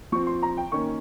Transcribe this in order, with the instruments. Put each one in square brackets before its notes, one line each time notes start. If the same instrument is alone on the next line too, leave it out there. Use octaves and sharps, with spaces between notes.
[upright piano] F3 C4 C#6
C6
A#5
G5
D#3 A#3 C#4 C#6